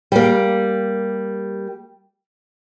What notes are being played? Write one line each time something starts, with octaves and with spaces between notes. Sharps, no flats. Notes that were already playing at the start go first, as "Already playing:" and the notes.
G3 A#3